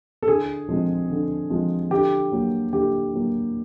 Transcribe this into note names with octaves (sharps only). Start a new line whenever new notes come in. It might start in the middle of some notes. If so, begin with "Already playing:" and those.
A4
D3 G#4
F3 G#3 C4
D3
F3 G#3 C4
D3 G4
F#3 A#3
D3 G4
F#3 A#3